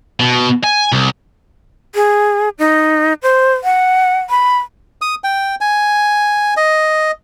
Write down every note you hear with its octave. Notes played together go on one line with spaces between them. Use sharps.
B2
G#5
C2
G#4
D#4
C5
F#5
B5
D#6
G5
G#5
D#5